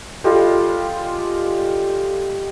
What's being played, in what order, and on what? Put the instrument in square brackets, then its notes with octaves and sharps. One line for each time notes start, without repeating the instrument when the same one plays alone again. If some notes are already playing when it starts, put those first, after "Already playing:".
[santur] G3 G#3 G4 [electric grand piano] F4 A4